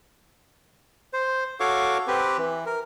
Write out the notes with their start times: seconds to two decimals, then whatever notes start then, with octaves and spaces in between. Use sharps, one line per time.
1.13 C5
1.60 F#4 A4 C#5 F5 C#6 D6
2.08 C4 G4 B4
2.38 E3
2.66 A#4